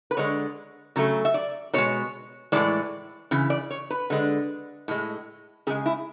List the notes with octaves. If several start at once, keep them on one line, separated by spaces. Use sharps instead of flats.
B4
D3 G#3 C#5
C#3 F#3 A3
E5
D5
B2 G#3 C#5
A2 E3 G#3 D5
C#3 E3
D5
C#5
B4
D3 G#3
A2 G#3
C#3 G#3 G#4
E4